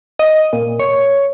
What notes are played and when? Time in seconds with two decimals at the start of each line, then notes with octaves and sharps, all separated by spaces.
0.19 D#5
0.53 A#2
0.80 C#5